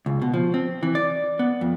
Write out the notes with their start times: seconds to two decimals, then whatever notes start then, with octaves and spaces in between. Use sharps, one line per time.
0.06 C#2
0.22 B2
0.34 F3
0.54 C4
0.83 E3
0.95 D5
1.39 B3
1.61 F2